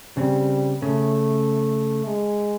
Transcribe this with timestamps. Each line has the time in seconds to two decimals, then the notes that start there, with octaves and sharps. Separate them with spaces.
0.17 C#3 G3 C4
0.82 C#3 A3
2.07 G#3